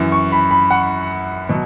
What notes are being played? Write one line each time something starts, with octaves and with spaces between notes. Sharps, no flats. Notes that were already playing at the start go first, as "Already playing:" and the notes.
Already playing: F#2 E3
C#6
B5
B5
F#5
B2 F#3